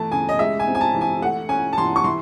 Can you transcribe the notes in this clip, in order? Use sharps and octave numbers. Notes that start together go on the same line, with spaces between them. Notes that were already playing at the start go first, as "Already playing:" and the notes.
Already playing: E3 A3 A5
C#3 G#5
D#5
G#3 E5
G#5
C4
G#5
A5
E3
G#5
A3 F#5
C#4 G#5
A5
E3 C6
C#6
E3 C6